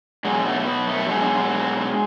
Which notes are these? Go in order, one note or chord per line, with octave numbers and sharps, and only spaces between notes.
B2 F#3 G#3
A3
B3
A3
B2 F#3 G#3